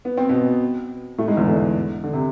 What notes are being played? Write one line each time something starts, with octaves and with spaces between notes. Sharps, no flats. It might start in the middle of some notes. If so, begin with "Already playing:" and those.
B3
C4
B2 B3
A2 A3
G#2 G#3
E2 E3
D3
D3
C3